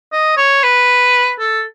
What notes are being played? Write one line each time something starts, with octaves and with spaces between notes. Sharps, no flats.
D#5
C#5
B4
A4